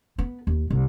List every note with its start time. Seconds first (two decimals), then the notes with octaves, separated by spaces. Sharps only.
0.18 B3
0.47 D#2
0.70 C2